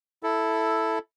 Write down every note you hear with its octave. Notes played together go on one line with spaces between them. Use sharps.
E4 A4